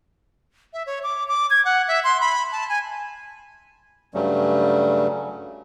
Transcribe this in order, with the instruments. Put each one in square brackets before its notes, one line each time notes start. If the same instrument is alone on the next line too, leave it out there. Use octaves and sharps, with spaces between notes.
[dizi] E5
C#5
D6
D6
G#6
F#5
E5
C6
B5
A5
G#5
[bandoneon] G2 C#3 F#3 G3 A3 C#4